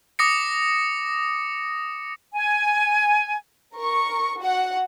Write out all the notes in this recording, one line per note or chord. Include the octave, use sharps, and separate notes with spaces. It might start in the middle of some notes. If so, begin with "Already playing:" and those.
D6 D#6 A#6 C#7
G#5
A#4 C#6
F#4 F#5